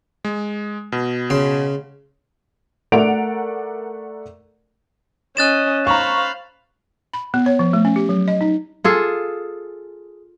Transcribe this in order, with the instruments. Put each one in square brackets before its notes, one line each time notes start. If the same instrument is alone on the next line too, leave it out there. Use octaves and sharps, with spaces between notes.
[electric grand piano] G#3
B2
[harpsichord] C#3 C6
[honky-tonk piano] A3 A#4 D5 F#5 D7 F7
[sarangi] C#4 [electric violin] D#5 [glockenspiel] F#6 A6 E7
[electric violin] C5 B5 [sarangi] F5 [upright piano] A#5 C#6
[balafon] B5
B3
C#5
F3
A3
C#4
G4
F#3
D#5
D#4
[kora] F4 G#4 A4